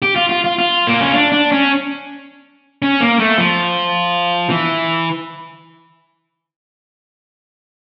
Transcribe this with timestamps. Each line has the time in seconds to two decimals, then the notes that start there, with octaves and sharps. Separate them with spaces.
0.02 G4
0.16 F4
0.29 F4
0.44 F4
0.58 F4
0.87 A#3
1.00 C#4
1.14 D4
1.32 D4
1.52 C#4
2.82 C#4
3.00 A#3
3.19 A3
3.38 F3
4.49 E3